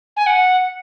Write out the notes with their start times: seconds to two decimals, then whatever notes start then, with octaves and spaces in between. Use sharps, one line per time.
0.17 G#5
0.27 F#5